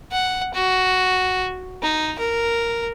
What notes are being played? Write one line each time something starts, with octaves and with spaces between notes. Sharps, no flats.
F#5
F#4
D#4
A#4